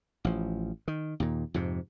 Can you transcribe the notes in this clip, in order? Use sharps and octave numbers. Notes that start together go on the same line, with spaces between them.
A1 F3
D#3
D#2 A#2
F2 G#2 C3